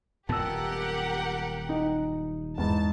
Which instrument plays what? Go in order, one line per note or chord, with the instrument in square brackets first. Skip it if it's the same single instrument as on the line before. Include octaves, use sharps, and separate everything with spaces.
[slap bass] D#1 F#2 B3 [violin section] G4 A#4 F#5 [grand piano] A5 E6
[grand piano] D#4
[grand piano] E2 G#2 [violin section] A5